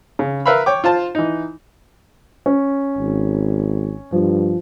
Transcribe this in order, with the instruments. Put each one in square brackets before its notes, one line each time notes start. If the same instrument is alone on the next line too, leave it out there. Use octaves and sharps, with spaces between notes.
[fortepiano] C#3
A#4 B4 E5 F5 B5
C#5 G5 D6
F4 C5 A5
E3 D#4
[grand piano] C#4
[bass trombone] G#1
[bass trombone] G2 [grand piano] F3